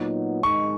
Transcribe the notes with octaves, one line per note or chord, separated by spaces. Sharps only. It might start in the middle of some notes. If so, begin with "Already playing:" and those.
Already playing: A#2 F#3 B3 D#4
G#2 D#3 G#3 D#4 C#6